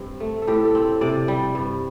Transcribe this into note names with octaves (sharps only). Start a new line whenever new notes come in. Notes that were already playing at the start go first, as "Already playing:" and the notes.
Already playing: G2 C4
A3
A4
A2 G4
A4
C4
C3 D5
G3
G2